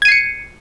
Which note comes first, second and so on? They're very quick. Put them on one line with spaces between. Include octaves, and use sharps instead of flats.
G#6 D#7 C7 C#7